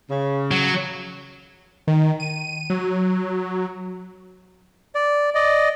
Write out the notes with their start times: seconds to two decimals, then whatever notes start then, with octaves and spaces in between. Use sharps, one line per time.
0.10 C#3
0.51 F#3
1.88 D#3
2.20 D#7
2.70 F#3
4.95 D5
5.35 D5 D#5